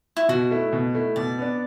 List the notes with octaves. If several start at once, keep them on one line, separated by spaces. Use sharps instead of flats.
E4
B2 F#4
A3 E4
B2
A3 E4
B2 D5
B3 D4